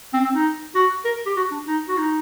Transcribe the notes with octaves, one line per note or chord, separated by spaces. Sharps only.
C4
C4
D#4
F#4
A#4
G4
F#4
D4
D#4
F#4
D#4